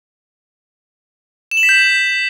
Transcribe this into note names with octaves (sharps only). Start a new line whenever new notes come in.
E7
F#7
B6
G6